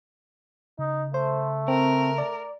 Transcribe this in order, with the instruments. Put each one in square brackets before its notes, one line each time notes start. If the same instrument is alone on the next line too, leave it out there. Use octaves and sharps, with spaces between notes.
[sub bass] C#3 [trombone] D#4
[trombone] A3 [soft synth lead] C5
[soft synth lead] C4 [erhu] A#4
[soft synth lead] D5